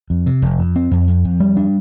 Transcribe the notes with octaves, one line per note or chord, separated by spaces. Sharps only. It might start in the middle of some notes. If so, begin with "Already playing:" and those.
F2
C3
F1
F2
C4
F2
F2
F2
G3
D4